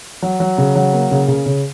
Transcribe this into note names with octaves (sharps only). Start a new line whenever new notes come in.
F#3
F#3
C#3
F#3
A#3
C#3
C#3
C#3